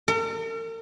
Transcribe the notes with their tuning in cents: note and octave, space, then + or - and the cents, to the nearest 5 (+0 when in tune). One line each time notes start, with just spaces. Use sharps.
A#4 -45